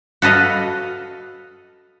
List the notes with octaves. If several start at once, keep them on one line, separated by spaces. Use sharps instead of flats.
F#4 A4 B4 D#5 F5